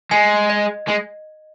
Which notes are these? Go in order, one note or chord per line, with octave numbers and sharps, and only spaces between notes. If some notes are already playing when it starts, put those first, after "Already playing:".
G#3 G#5
D#5
G#3